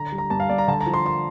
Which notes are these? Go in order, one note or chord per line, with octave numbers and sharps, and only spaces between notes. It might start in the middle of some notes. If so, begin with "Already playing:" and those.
Already playing: D3 A#5
G3
A#5
G2 A5
F5
G2 D5
A#5
D3 A5
A#5
F3
C6
C6